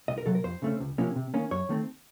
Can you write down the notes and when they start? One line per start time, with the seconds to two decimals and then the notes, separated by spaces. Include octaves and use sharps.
0.08 C2 D#5
0.18 A#4
0.26 C3 F#3 A4
0.35 A#4
0.44 F2 C5
0.62 C#3 A3 C#4
0.80 C#2
0.98 C3 F3 A#3 C#4
1.16 C3
1.34 D#3 A#3 C#4
1.51 F#2 C#5
1.69 D#3 A3 C4